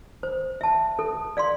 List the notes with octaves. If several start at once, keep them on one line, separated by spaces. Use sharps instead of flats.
C5
E5 A5
A4
D5 F5 C6